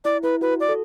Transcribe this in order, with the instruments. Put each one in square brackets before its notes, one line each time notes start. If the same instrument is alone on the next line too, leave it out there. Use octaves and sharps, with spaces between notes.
[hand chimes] E4 [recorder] D5
[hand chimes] E4 [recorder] B4
[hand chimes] F#4 [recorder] B4
[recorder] D5
[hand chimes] A4